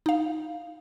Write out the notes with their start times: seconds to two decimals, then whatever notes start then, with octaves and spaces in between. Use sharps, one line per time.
0.06 D#4 F5